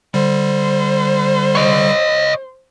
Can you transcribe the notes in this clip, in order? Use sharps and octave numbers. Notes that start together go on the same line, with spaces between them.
D3 G3 C5
C#5 D#5